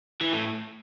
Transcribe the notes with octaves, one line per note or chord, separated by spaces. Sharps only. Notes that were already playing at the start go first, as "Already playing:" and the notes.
E3
A2